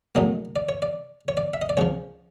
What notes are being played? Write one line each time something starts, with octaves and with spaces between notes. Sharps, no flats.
A#1 A2 F#3 A#3 D#5
D5
C#5
D5
C#5
D5
E5
D#5
D5
C#2 C#3 F3 C#5